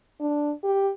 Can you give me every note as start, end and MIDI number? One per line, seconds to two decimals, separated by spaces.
0.20 0.52 62
0.64 0.91 67